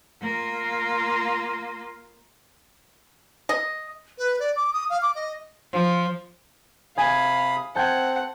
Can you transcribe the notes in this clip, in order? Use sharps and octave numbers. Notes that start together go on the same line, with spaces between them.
A#3 F4
D#5
B4
D5
D6
D#6
F5
D6
D#5
F3
C3 F5 G#5 B5 D#6
C4 F#5 A5 G6 G#6